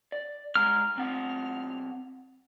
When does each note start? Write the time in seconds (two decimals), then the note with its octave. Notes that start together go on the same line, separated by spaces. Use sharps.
0.12 D5
0.56 G2 G#3 A#5 F6
0.96 B1 C4 F#5